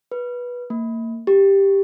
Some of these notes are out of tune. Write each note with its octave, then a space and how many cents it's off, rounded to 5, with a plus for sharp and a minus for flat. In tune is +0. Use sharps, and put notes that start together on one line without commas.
B4 -15
A#3 -30
G4 +5